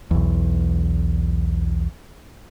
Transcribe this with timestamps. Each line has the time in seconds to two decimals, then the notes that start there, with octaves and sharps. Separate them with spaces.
0.11 B1 E2